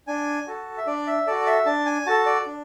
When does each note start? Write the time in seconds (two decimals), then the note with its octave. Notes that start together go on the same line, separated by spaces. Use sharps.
0.07 D4 G#5
0.47 F#4 A4
0.77 E5
0.87 D4 D5
1.07 E5
1.27 F#4 A4 D5
1.46 E5
1.66 D4 A5
1.86 G#5
2.06 F#4 A4 A5
2.26 D5
2.46 D4